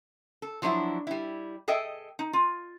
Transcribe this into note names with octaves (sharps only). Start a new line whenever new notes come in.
A4
F3 F#3 D4 E4 F#4
G3 E4
G#4 A4 D#5 E5 G5
D#4
F4